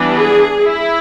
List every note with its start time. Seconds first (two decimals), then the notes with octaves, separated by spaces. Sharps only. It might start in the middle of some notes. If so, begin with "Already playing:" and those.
Already playing: E3 G3 B3 D4
0.18 G#4
0.64 E4